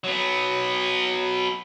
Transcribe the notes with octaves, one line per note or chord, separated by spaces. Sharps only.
F#3 B3